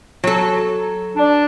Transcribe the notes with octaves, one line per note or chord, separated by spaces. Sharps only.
F#3 A4
D4